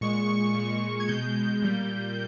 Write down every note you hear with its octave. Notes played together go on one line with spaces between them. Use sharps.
A#2 G#3 C#6
A#2 G#3
G#6
B2 G#3 G6
A#2 G3 A#3